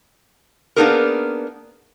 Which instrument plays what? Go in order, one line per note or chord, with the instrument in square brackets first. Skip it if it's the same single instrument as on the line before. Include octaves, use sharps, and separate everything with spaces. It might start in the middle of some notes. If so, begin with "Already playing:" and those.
[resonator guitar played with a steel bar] A#3 B3 D4 D#4 G#4 A#4